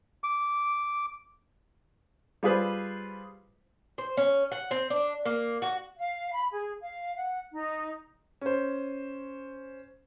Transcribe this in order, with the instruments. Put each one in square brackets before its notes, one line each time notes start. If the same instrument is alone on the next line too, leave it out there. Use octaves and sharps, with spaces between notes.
[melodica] D6
[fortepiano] G3 F4 G#4 B4 C5
[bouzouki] C5
C#4
F#5
C4
D4
A#3
F#4
[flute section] F5
B5
G#4
F5
F#5
D#4
[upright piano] C#4 C5